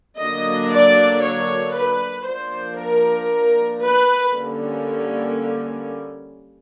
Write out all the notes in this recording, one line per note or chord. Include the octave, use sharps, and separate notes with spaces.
D3 F#3 A#3 D4 D#5
D5
C#5
B4
F3 A#3 D4 C5
A#4
B4
D3 G3 A#3 C#4